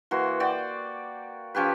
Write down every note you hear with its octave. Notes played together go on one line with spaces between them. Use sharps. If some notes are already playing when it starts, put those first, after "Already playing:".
E3 A#3 F#4 C6
F#4 D5 G5
F3 C#4 G4 B4